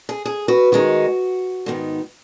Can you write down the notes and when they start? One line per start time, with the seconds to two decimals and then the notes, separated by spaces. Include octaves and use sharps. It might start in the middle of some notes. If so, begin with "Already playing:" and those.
0.09 G#4
0.25 G#4
0.48 F#4 B4
0.72 D#3 G#3 D#4 F#4
1.66 G#2 D#3 B3 D#4